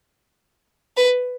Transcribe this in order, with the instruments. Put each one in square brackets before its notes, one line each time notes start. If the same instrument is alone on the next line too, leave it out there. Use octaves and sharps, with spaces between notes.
[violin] B4